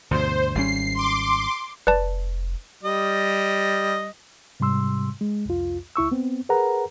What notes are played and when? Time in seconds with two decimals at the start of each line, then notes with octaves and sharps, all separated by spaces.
0.11 D2 G2 B2 C5
0.55 G#1 G3 C#4 C7
0.95 C6 D6
1.87 F1 B4 D5 A5
2.84 G3 D#5
4.60 G#2 C3 G3 C6 E6
5.21 G#3
5.46 C2 F2 F4
5.96 C#2 E4 C#6 E6
6.11 B3 C4
6.49 G#4 A#4 B4 F#5 A#5